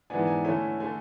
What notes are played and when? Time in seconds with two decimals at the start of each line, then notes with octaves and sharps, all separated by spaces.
0.10 G#2 E3 B3 D4 G#5
0.27 G#5
0.45 D3 A3 C#4 E4 G#5
0.80 D3 A3 G#5